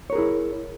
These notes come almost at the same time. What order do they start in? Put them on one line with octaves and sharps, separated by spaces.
C#5 A#4 G#4 E4